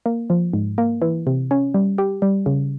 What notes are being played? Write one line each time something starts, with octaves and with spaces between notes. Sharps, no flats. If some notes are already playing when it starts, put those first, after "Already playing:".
A#3
F3
G#2
A#3
E3
C3
C#4
G3
G4
G3
C#3